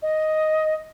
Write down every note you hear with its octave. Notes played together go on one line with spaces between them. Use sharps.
D#5